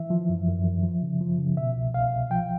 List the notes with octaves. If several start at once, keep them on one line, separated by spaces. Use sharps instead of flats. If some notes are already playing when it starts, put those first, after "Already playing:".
Already playing: E3 E5
F3
F#2
F#2
F#2
F3
C#3
F3
C#3
B2 E5
C2
C2 F5
C2
F3 G5